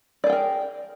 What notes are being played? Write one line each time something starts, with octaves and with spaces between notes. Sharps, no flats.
G#4 A#4 D5 G5